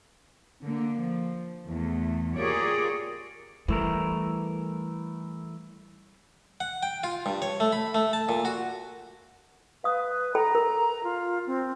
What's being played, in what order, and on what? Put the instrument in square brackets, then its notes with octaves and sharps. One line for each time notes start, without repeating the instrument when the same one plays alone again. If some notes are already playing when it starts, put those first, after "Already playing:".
[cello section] D3 A#3
F3
E2 A3
F4 G4 G#4 A#4 C#5 D5
[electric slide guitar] E3 A3 A#4 [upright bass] G3
[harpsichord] F#5
G5
F4
G2
C#5
A3
B5
A3
A5
A#2
F#4
[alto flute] B4 [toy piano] F5 D#6
[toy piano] A4 G5 B5 [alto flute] A#5
[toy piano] A#4
[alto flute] F4
C4